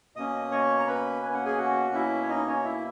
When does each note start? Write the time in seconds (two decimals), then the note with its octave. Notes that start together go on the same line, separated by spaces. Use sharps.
0.16 B2 A#3 C#4 D#5 D#6
0.51 C#5 C#6
0.79 A#5
0.87 B4 B5
1.23 G#5
1.34 F#5
1.45 G#4 G#5
1.58 F#4 F#5
1.94 E4 E5
2.22 C#5
2.29 D#4 D#5
2.47 C#4 C#5
2.64 E4 E5